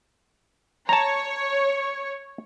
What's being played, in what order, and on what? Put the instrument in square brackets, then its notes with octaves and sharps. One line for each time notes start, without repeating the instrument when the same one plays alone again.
[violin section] C#5 [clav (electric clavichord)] A5 A#5